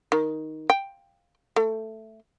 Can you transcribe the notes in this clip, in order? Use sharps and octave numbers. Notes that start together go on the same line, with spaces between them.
D#3
G5
A3